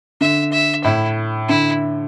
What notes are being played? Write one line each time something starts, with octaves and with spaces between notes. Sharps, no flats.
D3 E5
E5
A2 E4
D3 E4